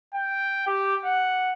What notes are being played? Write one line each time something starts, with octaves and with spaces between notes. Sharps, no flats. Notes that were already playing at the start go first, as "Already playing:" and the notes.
G5
G4
F#5